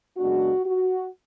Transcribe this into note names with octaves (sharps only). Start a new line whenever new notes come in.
F#2 C#3 G#3 B3 D4 F#4
F#4